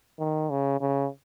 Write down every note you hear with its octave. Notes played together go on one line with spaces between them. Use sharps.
D#3
C#3
C#3